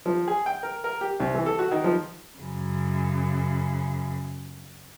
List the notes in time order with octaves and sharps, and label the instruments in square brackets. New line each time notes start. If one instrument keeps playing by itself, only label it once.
[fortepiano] F3
G#4
G5
A#4
A#4
G4
C2
E3
A4
F#4
D#3
F3
[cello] F#2 C#3